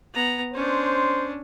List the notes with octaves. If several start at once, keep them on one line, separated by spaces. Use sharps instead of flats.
B3 A#5
C#4 D4 C5